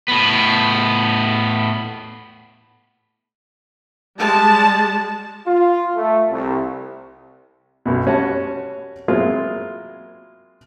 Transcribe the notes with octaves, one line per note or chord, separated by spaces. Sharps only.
A2 B3
G3 G#3 A5
F4
A3
C2
B1 F#2 B2
G3 C#4 F#4 C#5 F#5 A5
F#3 G#3 A#3 C4 E4 F4